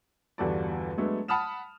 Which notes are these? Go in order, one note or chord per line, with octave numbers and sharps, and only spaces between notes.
G1 E2 G3 F#4 A4 D5
F#3 G#3 A3 B3 D4
F#5 A5 B5 D#6 F6 E7